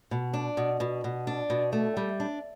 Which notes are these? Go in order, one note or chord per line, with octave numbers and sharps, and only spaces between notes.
B2
D4
B2
B2
B2
D4
B2
A3
G3
D4